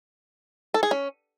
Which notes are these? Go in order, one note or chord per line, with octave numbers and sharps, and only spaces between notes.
A4
G#4
C#4